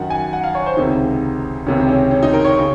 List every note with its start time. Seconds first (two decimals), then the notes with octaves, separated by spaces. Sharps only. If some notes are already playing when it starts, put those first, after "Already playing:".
Already playing: F#2 D#3 F#5
0.10 G#5
0.33 F#5
0.44 F5
0.55 C#5
0.66 C5
0.77 C#2 C3 D#3 D#4
1.66 C#2 C3 D#3 C#4
1.80 C4
1.88 C#4
2.11 C#4
2.23 D#4
2.33 A#4
2.45 C#5
2.60 C#3